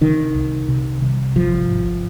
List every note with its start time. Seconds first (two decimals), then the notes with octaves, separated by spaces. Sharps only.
0.01 C3 D#3
0.35 C2
0.68 C3
1.02 C2
1.36 G#1 F3
1.70 G#1